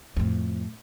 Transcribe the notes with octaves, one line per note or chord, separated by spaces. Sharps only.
F2 A2